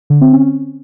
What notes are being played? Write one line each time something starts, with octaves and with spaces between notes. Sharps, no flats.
D3
C4
C#4